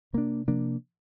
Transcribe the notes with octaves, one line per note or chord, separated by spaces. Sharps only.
C3 A#3 D4
C3 F3 A#3 D4